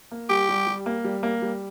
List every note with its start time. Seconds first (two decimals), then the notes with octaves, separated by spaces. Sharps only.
0.11 A#3
0.30 G3 G4
0.49 G3
0.67 G3
0.86 A#3
1.04 G3
1.23 A#3
1.42 G3